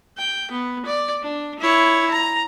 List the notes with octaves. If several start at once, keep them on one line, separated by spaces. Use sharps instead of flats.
G5
B3
D5
D4
E4 C#5
A#5